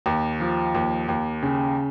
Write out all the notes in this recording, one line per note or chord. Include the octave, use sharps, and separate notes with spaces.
D#2
F3
D#2
D#2
C#3